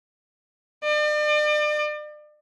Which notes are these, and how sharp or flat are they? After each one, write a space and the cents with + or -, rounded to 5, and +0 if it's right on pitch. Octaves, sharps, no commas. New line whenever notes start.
D5 +40